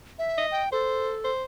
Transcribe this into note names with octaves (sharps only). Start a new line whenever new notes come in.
E5
D#5
G5
A4 C5
C5